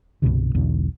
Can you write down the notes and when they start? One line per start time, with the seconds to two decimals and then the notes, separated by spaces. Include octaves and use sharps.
0.22 C2 G2 B2 D3
0.55 E1 B1 E2 D3